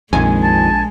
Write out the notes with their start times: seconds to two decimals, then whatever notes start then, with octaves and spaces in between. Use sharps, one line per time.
0.13 A#1 F2 D#3 G#3 G#5
0.43 A5